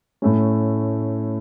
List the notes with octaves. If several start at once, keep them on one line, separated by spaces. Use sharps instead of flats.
A2 A3 C#4